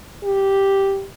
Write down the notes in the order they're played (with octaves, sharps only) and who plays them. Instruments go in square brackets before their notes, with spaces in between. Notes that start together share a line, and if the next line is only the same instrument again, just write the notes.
[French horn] G4